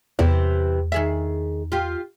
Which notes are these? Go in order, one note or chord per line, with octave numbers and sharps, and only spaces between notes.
E2 C3 E3
D#3 G#4 E5
F4 G4